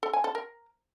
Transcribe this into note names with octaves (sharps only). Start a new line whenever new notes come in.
A4
G#5
A4
A#4